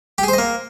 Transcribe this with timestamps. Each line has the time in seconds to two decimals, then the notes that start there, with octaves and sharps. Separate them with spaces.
0.18 G4
0.23 G#4
0.28 C5
0.33 D#5
0.38 A#3